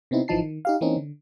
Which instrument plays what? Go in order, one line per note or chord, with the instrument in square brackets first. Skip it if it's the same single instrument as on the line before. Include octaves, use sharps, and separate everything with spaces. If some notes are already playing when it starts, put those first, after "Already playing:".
[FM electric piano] C3 B3 C4 D#4 E4
G#1 E3 F3 D#4 A5 C7
D#3
D#4 G4 F5
E3 A#3 C4 C#4 D#4
D3